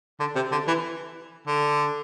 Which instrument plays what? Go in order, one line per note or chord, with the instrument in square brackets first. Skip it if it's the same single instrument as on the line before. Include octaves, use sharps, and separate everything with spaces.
[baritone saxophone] D3
C3
D3
E3
D3